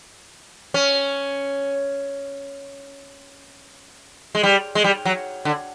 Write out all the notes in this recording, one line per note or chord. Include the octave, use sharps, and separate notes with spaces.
C#4
G#3
G3
G#3
G3
F#3
D3